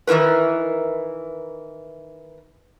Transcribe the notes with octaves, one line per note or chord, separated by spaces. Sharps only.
D#3 E3 E4 A#4 B4